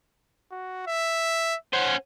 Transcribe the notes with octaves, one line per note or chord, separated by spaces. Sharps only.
F#4
E5
C#4 C5 F#5